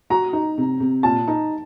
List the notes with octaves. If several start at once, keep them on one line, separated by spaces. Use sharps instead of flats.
F#4 A#5
D#4
C3
C3
A#2 A5
D#4